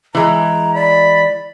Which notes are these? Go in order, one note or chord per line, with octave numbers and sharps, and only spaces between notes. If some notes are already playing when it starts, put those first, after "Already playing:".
E3 G#3 A#5
D5 B5